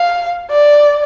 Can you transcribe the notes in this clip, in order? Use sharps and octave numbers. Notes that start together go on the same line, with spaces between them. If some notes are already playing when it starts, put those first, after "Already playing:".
Already playing: F5
D5